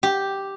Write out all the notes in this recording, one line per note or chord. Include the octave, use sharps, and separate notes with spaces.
G4